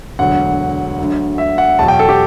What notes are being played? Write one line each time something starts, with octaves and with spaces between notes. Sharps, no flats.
E1 D2 D3 F#3 F#5
D2 D3 F#3
E5
F#5
E2 B2 F#3 A5
G5
A4
G4